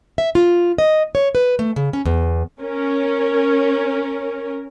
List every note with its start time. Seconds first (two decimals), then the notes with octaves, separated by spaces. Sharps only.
0.18 E5
0.35 F4
0.78 D#5
1.15 C#5
1.35 B4
1.59 A3
1.76 C#3
1.93 C#4
2.05 E2
2.61 C#4 A#4